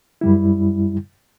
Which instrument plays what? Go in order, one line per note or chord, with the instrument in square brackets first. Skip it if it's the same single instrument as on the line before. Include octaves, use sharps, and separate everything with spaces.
[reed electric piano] F#2 G3 E4